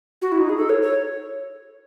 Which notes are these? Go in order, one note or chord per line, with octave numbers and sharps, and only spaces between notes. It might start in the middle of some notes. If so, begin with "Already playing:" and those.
F#4
E4
D#4
G#4
A4
C#5
C#5